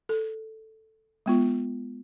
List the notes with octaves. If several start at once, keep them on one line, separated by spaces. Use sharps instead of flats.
A4
G#3 B3 F4